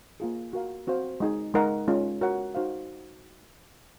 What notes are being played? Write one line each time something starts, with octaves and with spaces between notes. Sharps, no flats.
A#3 F4 G#4
F#4 A#4 F5
C4 F#4 C5 F5
G#3 D#4 G#4
G#3 D#4 A#4 D#5 F#5
G#3 C#4 F4
F#4 A#4 C#5 F#5
D#4 F#4 C5 F5